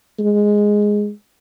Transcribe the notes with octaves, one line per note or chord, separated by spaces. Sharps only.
G#3